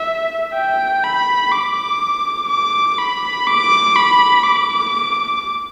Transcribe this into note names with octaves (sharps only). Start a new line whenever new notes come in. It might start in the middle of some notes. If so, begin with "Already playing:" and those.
Already playing: E5
G5
B5
D6
D6
B5
D6
B5
D6